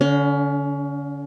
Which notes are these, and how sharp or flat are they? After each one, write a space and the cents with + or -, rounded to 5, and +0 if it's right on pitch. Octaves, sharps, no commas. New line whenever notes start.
D3 -25 C#4 +30